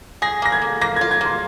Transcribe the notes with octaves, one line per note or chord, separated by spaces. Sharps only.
G#4 A#6
A#3 A#6
G#6
A#3
A#3 A#6
F4 G#6
G#6
A#3 C6